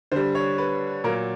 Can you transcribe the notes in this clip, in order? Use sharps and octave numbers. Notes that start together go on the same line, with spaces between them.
D3 G3 C5
C#5
B4
A#2 F#3 A#4